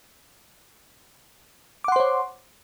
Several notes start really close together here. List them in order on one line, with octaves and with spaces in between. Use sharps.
D6 F#5 C6 C5 C#5